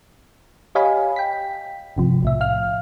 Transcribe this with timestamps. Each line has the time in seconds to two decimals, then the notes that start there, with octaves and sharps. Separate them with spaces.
0.75 G4 C#5 D#5 F5 G#5 B5
1.16 G5 B6
1.96 G1 C3 F3
2.22 B1 A2 E5
2.41 F5 F6